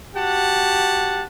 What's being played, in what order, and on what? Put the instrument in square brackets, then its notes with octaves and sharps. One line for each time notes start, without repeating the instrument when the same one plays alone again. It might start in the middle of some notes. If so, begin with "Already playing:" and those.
[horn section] F#4 G4 F#5 A5